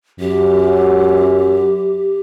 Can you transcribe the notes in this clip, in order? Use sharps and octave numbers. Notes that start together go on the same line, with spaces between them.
F#2 G4